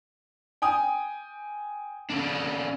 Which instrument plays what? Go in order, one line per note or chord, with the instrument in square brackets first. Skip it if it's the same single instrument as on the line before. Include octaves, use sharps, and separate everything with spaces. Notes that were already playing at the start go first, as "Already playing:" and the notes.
[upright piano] G5 G#5 D#6
[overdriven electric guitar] C#3 D4